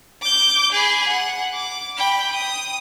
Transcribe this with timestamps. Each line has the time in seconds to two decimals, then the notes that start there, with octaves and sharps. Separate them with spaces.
0.22 D6 G6
0.72 G#4 B5
1.08 F#5
1.54 D6
1.97 G5 B5
2.32 D#6